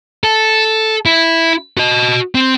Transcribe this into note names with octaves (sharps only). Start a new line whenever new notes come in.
A4
E4
F#4 D#5
C4